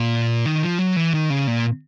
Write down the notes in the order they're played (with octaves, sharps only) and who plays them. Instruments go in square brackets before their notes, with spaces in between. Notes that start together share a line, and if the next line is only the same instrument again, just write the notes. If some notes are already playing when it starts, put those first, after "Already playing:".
Already playing: [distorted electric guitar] A#2
D#3
F3
F#3
E3
D#3
C#3
A#2